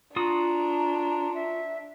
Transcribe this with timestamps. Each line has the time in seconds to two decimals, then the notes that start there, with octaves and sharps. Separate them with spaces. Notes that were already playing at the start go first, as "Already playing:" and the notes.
0.16 D4 F4 F#4 A#5 D#6
1.34 E5